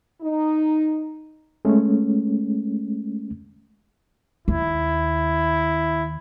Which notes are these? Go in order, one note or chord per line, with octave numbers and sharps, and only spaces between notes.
D#4
G#3 A3 C#4
D#2 E4